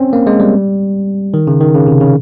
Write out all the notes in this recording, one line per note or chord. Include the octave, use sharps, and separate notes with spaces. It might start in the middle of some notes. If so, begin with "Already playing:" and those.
Already playing: C4 C#4
A#3
G#3
G3
D#3
C#3
D#3
C#3
C3
C#3